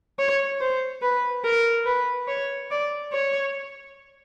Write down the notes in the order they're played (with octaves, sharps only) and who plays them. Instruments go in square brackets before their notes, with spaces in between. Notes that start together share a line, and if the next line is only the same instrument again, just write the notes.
[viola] C#5
C5
B4
A#4
B4
C#5
D5
C#5